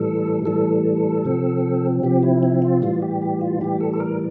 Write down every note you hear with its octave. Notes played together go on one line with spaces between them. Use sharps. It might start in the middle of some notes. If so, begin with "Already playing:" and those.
Already playing: A2 E3 G3 A4
A2 E3 G3 A4
C3 F3 C4
C3 F3 C4 G4
E4
E4
F4
A2 E3 G3 F4
G4
G4
F4
A2 E3 G3 G4
A4
A4
A#4